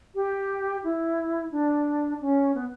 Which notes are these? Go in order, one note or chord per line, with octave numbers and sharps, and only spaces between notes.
G4
E4
D4
C#4
B3